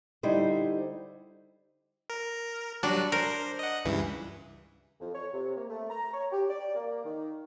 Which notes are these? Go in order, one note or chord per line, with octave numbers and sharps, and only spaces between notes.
D3 G3 D#4 E4 C5
A#4
F#3 G3 D4 F#4
A#4 C5
D#5 F#5
C#2 G2 E3
F2
C#5
C3
A#3
A3
A#5
C#5
G4
D5
A#3
D#3